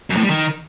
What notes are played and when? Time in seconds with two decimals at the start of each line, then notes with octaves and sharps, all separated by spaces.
0.10 F#2
0.17 A2
0.23 G3
0.30 D#3